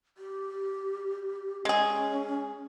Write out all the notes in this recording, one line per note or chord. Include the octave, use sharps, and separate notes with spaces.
G4
G#3 C#4 G#4